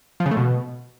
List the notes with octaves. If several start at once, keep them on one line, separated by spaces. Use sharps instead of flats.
F3
C#3
A3
B2